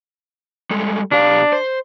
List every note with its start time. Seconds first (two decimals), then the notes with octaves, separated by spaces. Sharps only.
0.71 G3 G#3 A4
1.12 B2 D4 G4 F5
1.53 C5